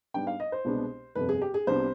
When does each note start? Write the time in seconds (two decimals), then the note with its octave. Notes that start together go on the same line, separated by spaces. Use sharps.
0.14 G#2 G3 B3 D4 G5
0.27 F5
0.40 D#5
0.52 C5
0.65 C2 B2 G#3 B3 D4
1.15 G1 F2 C3 B4
1.29 G#4
1.42 G4
1.54 G#4
1.67 C2 C3 G3 B3 D4 C5